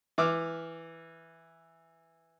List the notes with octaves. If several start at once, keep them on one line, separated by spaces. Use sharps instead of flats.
E3 D6 E6 F6